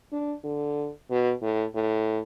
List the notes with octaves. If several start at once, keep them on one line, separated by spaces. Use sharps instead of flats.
D4
D3
B2
A2
A2